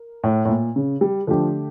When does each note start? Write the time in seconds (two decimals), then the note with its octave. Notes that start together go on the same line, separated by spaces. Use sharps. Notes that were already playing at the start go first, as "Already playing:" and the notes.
Already playing: A#4
0.24 A2
0.45 A2
0.49 A#2
0.76 C#3
1.01 G3
1.27 D3 F3 A3 D4 G4